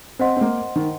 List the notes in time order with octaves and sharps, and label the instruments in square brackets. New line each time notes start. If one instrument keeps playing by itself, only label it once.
[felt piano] C4 [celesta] C5 D#5 F#5 C6
[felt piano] C4
A#3
D#3